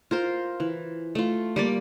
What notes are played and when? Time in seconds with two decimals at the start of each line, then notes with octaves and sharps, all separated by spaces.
0.11 F4 A#4 C5
0.60 E3
1.15 A3 F4
1.56 G3 A#3 D5